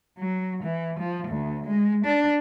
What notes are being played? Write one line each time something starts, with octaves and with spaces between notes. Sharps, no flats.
F#3
E3
F3
D2
G#3
D4